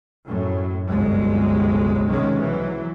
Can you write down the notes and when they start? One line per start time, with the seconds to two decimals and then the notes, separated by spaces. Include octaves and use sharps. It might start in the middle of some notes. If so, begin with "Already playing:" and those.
0.25 F#2 A2 F#3
0.88 G1 C#2 C3 F#3 G#3
2.06 B1 C3 D#3 G#3 C#4
2.39 E3 F#3